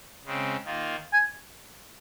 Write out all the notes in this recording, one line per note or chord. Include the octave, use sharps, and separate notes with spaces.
C#3 G#3 C4
D#3 A#3 F4
G#5